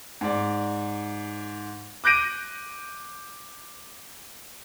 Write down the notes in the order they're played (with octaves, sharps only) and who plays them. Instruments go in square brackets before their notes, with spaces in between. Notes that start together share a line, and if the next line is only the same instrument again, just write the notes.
[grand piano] G#2 D5
D6 F#6 G6 A#6 D7 D#7